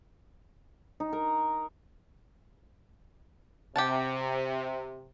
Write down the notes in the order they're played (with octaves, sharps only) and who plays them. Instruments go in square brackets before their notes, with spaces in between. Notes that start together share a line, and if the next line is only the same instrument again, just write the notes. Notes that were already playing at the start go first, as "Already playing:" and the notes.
[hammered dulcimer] D#4
A#4
[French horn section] C3 [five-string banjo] G4 F#5 A5